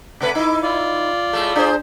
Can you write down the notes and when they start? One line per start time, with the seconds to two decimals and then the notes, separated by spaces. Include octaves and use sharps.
0.21 C3 A3 B4 D6
0.35 D#4 E4
0.62 F4 D5
1.33 A2 G#3 A3
1.56 D4 G#4 C5